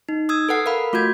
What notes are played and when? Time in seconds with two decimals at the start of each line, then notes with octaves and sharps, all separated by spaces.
0.09 D#4
0.29 D#6 E6 G#6
0.49 A4 B4 F#5 C7
0.66 A#4 F5 B5
0.93 A3 F4 F#4 G6 G#6